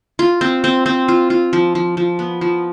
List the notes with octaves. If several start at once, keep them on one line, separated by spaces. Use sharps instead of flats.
F4
C4
C4
C4
F4
F4
F3
F3
F3
B3
F3